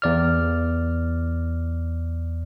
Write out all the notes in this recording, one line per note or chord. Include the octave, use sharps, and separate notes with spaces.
E2 D5 F6